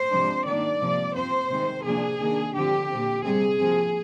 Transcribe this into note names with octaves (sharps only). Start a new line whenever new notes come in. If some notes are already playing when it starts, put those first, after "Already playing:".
Already playing: C5
C3 F3 G#3 D4
D#3 A#3 D4 D5
C3 F3 A#3
F3 C4 C5
C3 D#3 G#3
C3 F3 A#3 D4 G#4
D#3 A#3 D4
D3 F3 C4 G4
A#2 F3 C4
C3 G3 C4 G#4
C3 F3 A#3